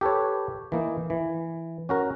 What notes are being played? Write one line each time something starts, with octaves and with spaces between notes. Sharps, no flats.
G4 A4 B4 C#5
E3 A#3 D#4
E3
C#4 F#4 A#4